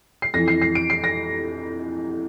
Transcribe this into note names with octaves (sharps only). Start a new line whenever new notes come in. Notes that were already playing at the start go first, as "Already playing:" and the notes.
C7
F2 E3 A#6
C7
C7
D7
C7
A#6